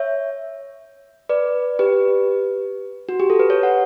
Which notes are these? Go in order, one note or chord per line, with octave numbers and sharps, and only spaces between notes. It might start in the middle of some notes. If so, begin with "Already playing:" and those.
Already playing: C#5 E5
B4 D5
G4 B4
F#4
G4
A4
B4
A4 C#5
F#5